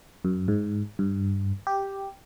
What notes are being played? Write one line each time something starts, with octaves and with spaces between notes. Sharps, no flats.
F#2
G#2
G2
G4